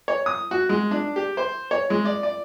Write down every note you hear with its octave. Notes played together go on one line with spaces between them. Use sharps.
C#5
D#6
F#4
G#3
D4
G4
C5
C#5
G#3
D5
D5